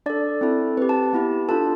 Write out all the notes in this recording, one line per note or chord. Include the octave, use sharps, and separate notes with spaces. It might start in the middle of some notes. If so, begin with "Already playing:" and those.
D4 A4 D5
C4 E4 A4
C4 G4 B4
A5
B3 E4 G4
D4 F4 A4 A5